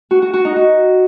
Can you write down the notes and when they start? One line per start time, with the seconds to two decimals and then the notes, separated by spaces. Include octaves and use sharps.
0.11 F#4
0.22 F#4
0.33 F#4
0.45 D#4
0.56 F#4